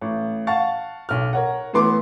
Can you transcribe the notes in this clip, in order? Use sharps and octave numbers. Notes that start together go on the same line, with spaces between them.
A1
F5 F#5 A5 C#6 A6
B1 F6
A#4 C#5 F#5
A2 E3 B3 C6 D6